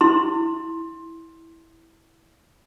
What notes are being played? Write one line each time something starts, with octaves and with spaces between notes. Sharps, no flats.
E4 C6